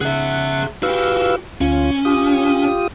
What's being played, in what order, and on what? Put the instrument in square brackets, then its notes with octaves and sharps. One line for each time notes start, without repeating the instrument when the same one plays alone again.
[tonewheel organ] C#3 F#5 [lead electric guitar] G#4 E5
[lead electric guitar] F#4 G4 [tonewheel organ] B4 F5 E6
[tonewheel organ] D2 F4 [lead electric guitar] C#4
[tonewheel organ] F4 G4 D#6